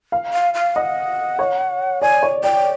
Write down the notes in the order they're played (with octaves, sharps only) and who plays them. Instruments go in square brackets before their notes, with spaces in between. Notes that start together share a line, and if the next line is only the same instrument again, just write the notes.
[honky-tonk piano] F5
[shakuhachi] F5
F5
[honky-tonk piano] D#5 [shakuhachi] F#5
[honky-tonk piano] C#5
[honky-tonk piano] D5 [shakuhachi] G#5
[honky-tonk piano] C#5
[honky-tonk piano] D5 [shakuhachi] G5